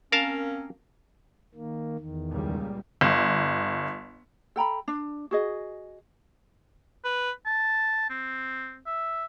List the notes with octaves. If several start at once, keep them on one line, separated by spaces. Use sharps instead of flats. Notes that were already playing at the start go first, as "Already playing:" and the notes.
A#3 C4 C#4 A#4 F5 A5
D#3 A#3
E2 D#3
C#2 A#2 G3
G1
A4 G5 A#5 B5
D4
F#4 G#4 D#5
B4
A5
C4
E5